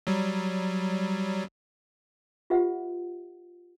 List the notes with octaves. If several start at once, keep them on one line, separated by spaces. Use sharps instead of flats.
F#3 G3
F4 G4 B4 E5 F#5